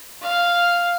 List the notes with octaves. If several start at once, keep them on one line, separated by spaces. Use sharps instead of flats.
F5